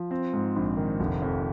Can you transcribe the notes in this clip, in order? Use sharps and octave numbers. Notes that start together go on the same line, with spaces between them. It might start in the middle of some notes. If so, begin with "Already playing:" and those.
Already playing: F3
C4
G#2
A#1
D#3
F1
F2